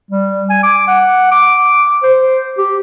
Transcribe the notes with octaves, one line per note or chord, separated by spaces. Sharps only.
G3
G#5
D6
F#5
D6
C5
G4